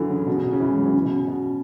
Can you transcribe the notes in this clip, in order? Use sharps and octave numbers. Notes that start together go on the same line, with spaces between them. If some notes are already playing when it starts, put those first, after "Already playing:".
Already playing: D3 E3 F#3
C#3
B2
C#3
B2
C#3
E3
G#3
F#3
E3
C#3
B2
C#3
B2